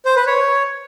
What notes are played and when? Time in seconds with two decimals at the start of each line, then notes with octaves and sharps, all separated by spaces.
0.05 C5
0.16 B4
0.27 C#5